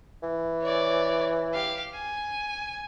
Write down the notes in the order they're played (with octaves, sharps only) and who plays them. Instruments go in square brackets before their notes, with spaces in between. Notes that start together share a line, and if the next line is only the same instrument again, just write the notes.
[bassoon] E3
[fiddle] C#5 D5
G4 F5
G#5